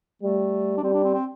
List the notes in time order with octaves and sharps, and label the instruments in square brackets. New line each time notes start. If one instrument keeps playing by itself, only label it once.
[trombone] G3 [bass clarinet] A3
[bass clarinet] D4
[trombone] G3 [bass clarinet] C4
[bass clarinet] D4
C4
C4